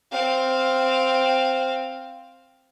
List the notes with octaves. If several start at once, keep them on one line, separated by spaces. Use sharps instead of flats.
C4 F5